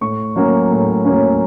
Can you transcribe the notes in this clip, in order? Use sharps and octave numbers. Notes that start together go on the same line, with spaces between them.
A2 C#6
F#3 A#3 C#4
A2
F#3 A#3 C#4